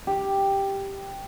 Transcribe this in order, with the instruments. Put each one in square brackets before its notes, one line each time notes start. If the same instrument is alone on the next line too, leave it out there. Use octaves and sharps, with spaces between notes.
[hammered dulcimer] G4